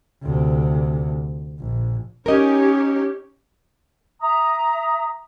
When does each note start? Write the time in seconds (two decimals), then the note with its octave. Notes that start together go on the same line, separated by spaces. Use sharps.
0.23 D2 C3
1.60 A#1
2.26 C#4 D#4 G4 A#4 C#5 D#5
4.20 E5 A#5 D#6